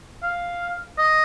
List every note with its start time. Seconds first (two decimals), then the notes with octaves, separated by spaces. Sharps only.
0.23 F5
0.98 D#5